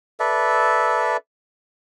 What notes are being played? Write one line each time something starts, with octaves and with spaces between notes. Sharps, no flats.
A4 B4 D5 E5